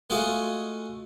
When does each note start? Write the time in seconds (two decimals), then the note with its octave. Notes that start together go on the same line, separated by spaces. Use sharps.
0.10 G#3 A3 F4 F#4 G#4